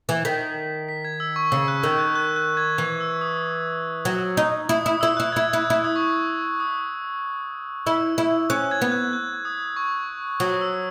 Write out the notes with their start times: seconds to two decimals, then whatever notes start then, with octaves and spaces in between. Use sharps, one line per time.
0.09 E3
0.25 D#3 B6
0.89 B6
1.05 G#6
1.20 E6
1.36 C#6
1.51 C#3 E6
1.68 F#6
1.83 D#3 E6
1.99 F#6
2.15 F#6
2.36 F#6
2.57 G#6
2.78 E3 F#6
3.01 E6
3.21 D#6
4.05 F#3
4.37 D#4
4.69 E4 D#6
4.85 E4 D#6
5.01 E4 E6
5.17 E4 F#6
5.32 E4 G#6
5.53 E4 F#6
5.70 E4
5.84 D#6
5.96 C#6
6.60 D#6
7.86 E4 E6
8.18 E4
8.50 C#4 F#6
8.71 G#6
8.82 B3
8.92 F#6
9.13 F#6
9.45 D#6
9.76 C#6
10.40 F#3 D#6
10.61 E6